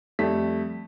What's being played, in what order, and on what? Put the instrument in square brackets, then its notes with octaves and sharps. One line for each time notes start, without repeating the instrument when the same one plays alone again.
[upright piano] F2 G3 A3 B6